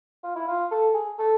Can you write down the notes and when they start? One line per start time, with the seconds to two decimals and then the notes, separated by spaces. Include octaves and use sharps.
0.23 F4
0.35 E4
0.47 F4
0.71 A4
0.94 G#4
1.19 A4